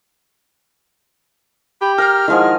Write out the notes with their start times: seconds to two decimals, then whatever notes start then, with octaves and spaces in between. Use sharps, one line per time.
1.81 G4 B5
1.98 A#4 A#5 F6
2.28 D#3 F3 G#3 E4 G#4 F#5